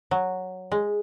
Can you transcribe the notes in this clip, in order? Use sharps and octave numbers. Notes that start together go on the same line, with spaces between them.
F#3
G#3